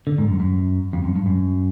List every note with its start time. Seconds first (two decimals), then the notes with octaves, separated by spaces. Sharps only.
0.07 D3
0.18 G#2
0.29 F#2
0.40 F#2
0.93 F2
1.04 F#2
1.15 G2
1.26 F#2